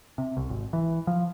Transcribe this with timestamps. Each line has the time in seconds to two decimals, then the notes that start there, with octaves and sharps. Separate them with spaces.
0.18 C3
0.37 C2
0.50 G#1
0.73 E3
1.07 F3